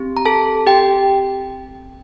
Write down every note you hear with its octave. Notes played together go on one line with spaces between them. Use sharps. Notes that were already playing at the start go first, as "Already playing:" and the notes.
Already playing: C4 G4
A#5
A4 A5
G4 G5